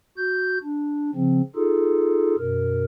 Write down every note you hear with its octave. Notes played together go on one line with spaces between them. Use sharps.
F#4 G6
D4
C#3 F3 C4
D#4 F4 G#4 A4
F#2 B2 A#4